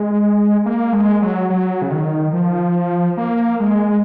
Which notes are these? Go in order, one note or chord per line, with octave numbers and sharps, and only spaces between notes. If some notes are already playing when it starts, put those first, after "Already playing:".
Already playing: G#3
A#3
G#3
F#3
F#3
C#3
D#3
F3
A#3
G#3